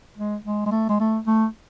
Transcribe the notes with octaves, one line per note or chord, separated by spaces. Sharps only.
G#3
G#3
G#3
A3
G#3
A3
A3